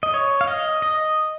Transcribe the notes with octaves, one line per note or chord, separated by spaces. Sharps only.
D#5
C#5
F5
D#5
D#5